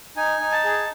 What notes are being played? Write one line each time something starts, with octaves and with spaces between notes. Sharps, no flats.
D#4 G#5
D#4
A5
G#4